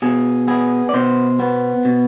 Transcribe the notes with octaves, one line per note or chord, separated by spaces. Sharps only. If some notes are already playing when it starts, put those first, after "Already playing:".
B2 G#4
B3 G#4
D5
B2 C5
B3
B2